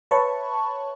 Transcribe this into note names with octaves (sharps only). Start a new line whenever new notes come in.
B4 C#5 E5 A5 B5 C#6